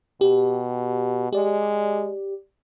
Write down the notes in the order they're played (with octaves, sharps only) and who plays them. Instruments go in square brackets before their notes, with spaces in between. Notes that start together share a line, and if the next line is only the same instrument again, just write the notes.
[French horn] B2 [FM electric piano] G4
[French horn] G#3 [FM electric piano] G4 D5